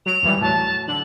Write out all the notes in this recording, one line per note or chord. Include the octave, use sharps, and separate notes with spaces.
F#3 D7 F7
D#2 E3 G3
A2 F#3 A5
D3 F#7